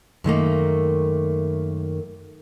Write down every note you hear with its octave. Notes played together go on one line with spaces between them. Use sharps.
F#2 D#3 A3 A#3